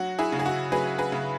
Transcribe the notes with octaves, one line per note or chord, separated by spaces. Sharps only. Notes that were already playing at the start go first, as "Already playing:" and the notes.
Already playing: F#3 F#4
E4 G#4
C#3
G#4
F#4
F#3 G#4 B4
G#4 B4
C#3